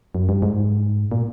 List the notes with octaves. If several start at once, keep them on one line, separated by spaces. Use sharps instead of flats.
F#2
G2
G#2
A#2